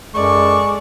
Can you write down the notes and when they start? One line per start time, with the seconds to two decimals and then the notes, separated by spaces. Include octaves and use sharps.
0.15 F#2 G#3 A4 D5 C#6